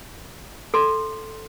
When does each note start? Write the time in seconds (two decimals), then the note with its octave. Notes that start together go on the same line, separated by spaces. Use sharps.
0.74 A4 C6